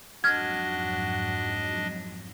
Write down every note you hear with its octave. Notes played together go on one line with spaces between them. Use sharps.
F2 G#2 F#3 D4 F#4 D#5 F6 G#6